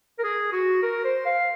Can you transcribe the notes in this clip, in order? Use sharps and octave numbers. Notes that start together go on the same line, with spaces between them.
A#4
G#4
F#4
A#4
C5
F5